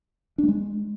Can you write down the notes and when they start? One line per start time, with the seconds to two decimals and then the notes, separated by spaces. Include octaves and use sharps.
0.38 D4
0.43 A3
0.48 G#3